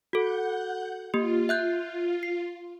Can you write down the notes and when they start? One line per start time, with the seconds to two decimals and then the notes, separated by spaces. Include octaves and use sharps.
0.13 F#4 A4 F#5 G6
1.14 A#3 F4 G4
1.49 E5 F#6 G6
2.23 C7